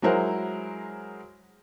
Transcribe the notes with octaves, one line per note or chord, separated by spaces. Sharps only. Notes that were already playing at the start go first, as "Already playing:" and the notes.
F#3 G#3 E4 A#4 C5 F#5